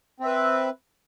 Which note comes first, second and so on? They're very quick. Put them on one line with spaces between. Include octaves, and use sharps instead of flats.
C4 E5 B4